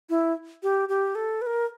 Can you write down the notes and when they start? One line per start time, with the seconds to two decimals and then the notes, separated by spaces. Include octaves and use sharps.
0.10 E4
0.63 G4
0.89 G4
1.15 A4
1.42 B4
1.46 A#4